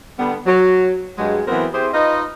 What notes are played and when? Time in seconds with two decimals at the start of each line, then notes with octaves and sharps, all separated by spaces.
0.19 D3 G3 B3
0.46 F#3
1.18 G2 F#3 G#3
1.47 E3 F#3 B3 C4 A#4
1.74 C4 E4 G4 G#4 C5
1.93 D#4 F4 B4 D#5